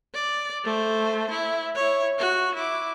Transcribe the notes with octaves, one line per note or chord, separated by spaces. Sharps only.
D5
A3 C5
E4
E4 C#5
F#4
E4 D6